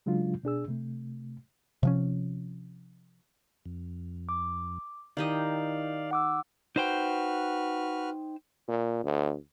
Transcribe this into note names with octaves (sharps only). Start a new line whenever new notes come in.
C#3 F#3 G#3 D4 F4
B2 D4 G#4 E6
C3 A3
C3 F3 C#4
F2
D6
D#3 E4 G4 D5 D#5 F5
F#5 D6 E6
D#4 F#4 B4 C5 G5 F6
A#2
D2